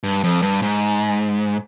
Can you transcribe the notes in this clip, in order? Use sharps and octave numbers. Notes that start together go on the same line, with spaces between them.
G2
F2
G2
G#2